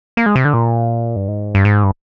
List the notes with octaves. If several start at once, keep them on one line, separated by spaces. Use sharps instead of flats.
A#3
G#3
C3
D3
A#2
G2
G#2
G2
G#2
G2